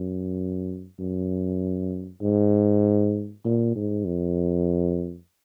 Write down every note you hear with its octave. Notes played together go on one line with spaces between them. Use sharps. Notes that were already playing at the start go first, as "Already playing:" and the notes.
Already playing: F#2
F#2
G#2
A#2
G#2
F2